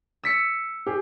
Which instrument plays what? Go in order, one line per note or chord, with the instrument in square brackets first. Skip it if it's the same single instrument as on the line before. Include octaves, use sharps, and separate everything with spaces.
[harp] E6 B6 C#7
[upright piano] G4 G#4